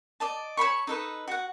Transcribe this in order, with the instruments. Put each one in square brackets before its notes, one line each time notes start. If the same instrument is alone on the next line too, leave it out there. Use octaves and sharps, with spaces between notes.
[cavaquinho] D5 D#5 A5
C#5 A5 B5 C#6
D#4 A4 B4 D#6
F#4 F#5